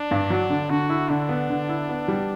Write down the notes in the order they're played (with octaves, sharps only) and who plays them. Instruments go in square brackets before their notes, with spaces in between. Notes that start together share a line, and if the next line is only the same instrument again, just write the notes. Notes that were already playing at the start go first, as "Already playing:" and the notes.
Already playing: [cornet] D4
[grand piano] G2
F#3
D3
[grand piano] D3 [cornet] F#4
[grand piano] E4
[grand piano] D3 [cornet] D4
[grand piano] B3
D3
E4
B3
G3